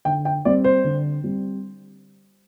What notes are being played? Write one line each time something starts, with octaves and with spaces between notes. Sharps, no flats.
D3 G5
G5
G3 C4 D5
C5
D3
G3 C4